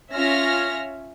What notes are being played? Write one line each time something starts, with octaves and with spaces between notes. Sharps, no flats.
C#4 F4 C#5 E5 F6 A#6